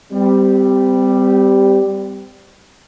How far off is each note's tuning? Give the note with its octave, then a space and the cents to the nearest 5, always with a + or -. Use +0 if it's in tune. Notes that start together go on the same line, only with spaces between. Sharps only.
G3 +0 C4 -40